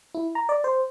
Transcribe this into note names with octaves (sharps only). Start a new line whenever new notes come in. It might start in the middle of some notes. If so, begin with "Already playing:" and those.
E4
A#5
D5
C5